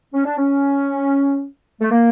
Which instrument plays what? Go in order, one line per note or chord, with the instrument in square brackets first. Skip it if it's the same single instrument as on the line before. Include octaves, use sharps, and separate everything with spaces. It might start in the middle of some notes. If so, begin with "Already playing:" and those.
[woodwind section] C#4
D4
C#4
A3
A#3